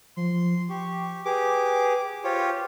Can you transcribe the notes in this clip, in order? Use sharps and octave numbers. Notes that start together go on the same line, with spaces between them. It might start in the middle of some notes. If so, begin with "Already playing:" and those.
F3 C6
G4 C#6
G4 G#4 B4 D6
F4 G4 C5 C#5